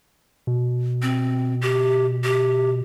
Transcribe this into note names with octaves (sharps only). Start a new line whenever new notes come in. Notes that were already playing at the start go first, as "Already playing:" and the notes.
B2
C4
G4
G4